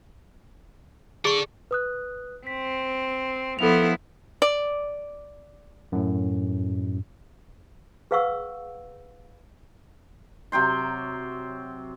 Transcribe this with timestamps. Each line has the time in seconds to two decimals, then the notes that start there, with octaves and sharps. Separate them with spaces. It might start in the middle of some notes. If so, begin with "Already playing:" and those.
1.25 G#4 A4 D5 C#6
1.71 B4 D#6 F#6
2.47 C4 B6
3.59 F3 B3 E4 A4 F7
4.42 D5
5.92 F#2 A2
8.11 G#4 B4 F5 F#5 C#6 E6
10.52 C3 F#3 G5 C6